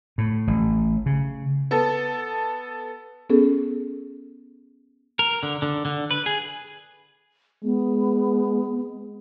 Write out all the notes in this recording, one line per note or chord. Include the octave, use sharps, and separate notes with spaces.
A2
A1
C#3
B3 A4
B3 C#4 G#4 A4
A#4
D3
D3
D3
B4
G#4
G#3 B3